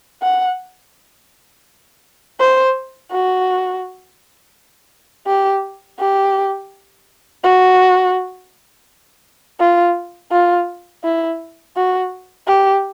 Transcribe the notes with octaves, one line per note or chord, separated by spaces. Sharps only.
F#5
C5
F#4
G4
G4
F#4
F4
F4
E4
F#4
G4